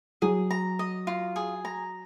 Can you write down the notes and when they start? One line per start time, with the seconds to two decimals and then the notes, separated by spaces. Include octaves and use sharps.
0.22 F#3 G#4
0.51 A#5
0.79 D#5
1.07 F4
1.36 G#4
1.65 A#5